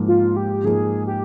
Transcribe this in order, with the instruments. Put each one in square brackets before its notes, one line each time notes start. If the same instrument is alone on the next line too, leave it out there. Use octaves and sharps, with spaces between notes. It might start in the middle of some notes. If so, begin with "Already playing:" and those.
Already playing: [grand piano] G#2 F3 A#3 D#4
[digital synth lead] F4
G4
[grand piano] G#2 F3 A#3 D#4 [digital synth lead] G#4
[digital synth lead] G4